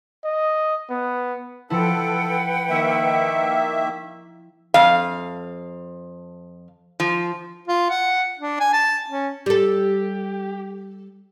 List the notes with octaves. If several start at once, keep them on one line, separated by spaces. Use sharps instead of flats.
D#5
B3
F3 E4 A4 B4 F#5 G5
D#3 A#3 E5
F2 F5
F3
F4
F#5
D4
G#5
A5
C#4
G3 G4 A4